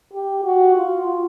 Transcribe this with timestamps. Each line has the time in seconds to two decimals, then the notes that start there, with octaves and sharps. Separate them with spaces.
0.14 G4
0.45 F#4
0.76 F4